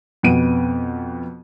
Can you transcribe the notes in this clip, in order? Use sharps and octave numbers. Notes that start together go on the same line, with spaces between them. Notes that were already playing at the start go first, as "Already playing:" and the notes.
F2 B2 B3 F#5 D7 D#7